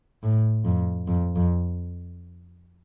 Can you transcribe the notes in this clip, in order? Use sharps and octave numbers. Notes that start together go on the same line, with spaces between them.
A2
F2
F2
F2